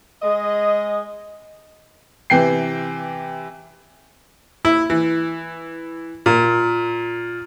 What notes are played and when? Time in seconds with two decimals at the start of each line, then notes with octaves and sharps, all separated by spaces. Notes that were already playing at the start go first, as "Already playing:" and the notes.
0.22 G#3 D#5
2.30 C3 E3 G5 C7
4.65 E4
4.90 E3
6.26 A#2